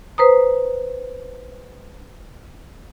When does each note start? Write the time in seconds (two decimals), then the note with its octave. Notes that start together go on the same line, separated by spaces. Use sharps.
0.18 B4 C5 A#5 D#6